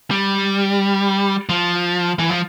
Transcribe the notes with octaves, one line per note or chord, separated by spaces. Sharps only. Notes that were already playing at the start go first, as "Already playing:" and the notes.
G3
F3
E3
F3